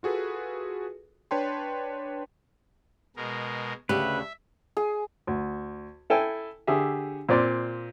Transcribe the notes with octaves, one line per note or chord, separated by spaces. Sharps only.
F4 F#4 G#4 A4 B4
D4 B4 C#5 G5 A5 C6
B2 G#3 A#4
D2 C#3 G4 B4 E5
G#4
D2
E4 A4 G5 G#5
D3 G4 G#4 E5
A#2 C4 D5 C6